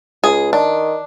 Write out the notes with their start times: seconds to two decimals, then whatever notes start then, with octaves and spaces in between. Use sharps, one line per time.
0.24 C#2 G#4
0.53 D#3 D4